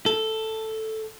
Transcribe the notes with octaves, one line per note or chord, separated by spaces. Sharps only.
A4